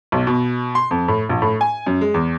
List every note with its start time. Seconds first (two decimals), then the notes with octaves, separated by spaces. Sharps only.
0.12 B1
0.27 B2
0.75 C6
0.91 F2
1.08 A2
1.29 A#1
1.42 A2
1.61 G#5
1.87 F#2
2.01 G#3
2.14 E2